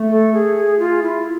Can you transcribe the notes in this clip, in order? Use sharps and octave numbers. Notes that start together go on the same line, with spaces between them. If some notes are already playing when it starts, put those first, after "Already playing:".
Already playing: A3
A4
G#4
G#4
F4
E4